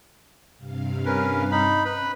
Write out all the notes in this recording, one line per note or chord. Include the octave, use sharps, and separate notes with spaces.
G2 C3 F5
C#4 A#4 B4
D#4 B5
C4 C#4 B4 B5